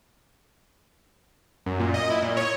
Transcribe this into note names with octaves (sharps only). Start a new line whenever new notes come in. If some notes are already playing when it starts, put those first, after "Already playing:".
F#2
A#2
D#5
E4
A#2
C#5